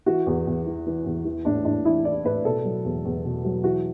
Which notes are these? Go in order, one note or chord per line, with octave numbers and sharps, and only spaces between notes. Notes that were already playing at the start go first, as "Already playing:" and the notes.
E3 F#4
E2
E2
E3
E3
E2
E3
A2 D4
A2 D4
E3 E4
E3 D5
A2 B4
B2 A4
F#3
E2
E2
B2
F#3
E3 F#4